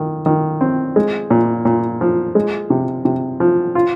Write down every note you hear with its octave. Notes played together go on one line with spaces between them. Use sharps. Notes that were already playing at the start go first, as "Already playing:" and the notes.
Already playing: D#3
D#3
C4
G#3
A#2
A#2
F3
G#3
C3
C3
F3
F4